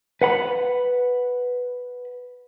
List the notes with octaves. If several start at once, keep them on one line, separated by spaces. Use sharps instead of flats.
B4 F#5 B5